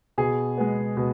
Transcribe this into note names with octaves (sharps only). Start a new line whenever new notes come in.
B2 G#4
G#3 B3
B2